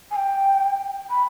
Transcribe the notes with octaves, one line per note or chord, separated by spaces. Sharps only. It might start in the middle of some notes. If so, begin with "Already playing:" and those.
G#5
G5
B5